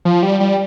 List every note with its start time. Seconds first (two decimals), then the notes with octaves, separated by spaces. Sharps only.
0.05 F3
0.23 G3
0.40 G3